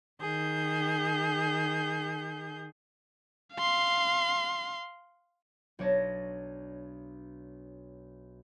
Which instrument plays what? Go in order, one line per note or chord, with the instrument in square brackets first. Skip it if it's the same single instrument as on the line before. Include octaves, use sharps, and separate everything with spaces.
[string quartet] D#3 G#4 G6
[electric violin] F5 C6
[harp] B1 D4 C#5 A5 A#6